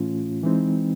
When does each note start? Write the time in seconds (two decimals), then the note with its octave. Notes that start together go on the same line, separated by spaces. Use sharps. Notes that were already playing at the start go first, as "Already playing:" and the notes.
Already playing: A2 E3 A3 C#4 F4
0.44 E3 G#3 C4 D#4